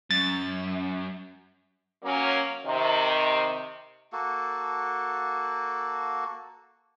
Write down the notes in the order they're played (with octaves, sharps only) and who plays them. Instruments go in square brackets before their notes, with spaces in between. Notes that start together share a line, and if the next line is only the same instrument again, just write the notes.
[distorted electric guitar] F#2 [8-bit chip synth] A6
[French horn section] F#3 A#3 C#4
C3 D#3
[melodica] A#3 F#4 A4